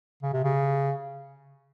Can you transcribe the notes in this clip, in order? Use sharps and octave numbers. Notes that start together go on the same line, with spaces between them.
C#3
C3
C#3